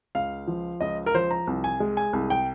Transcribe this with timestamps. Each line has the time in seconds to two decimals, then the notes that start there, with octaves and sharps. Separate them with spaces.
0.15 C#2 F5
0.47 F3
0.81 C#2 D#5
1.06 A#4
1.15 F3 C5
1.31 A#5
1.47 C2
1.64 G#5
1.80 G#3
1.97 G#5
2.13 C2
2.30 G5